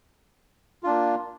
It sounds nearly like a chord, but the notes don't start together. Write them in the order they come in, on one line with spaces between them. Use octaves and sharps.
F4 D4 A#3